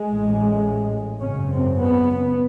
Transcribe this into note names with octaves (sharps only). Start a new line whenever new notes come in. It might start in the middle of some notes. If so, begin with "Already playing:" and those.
Already playing: G#3
A1 A2
G#1 F#2 C#3 C#4
C4
B3